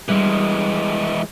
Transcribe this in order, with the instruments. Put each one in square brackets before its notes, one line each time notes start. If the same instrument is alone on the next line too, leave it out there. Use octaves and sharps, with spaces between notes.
[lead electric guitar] E3 G#3 [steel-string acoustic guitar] G3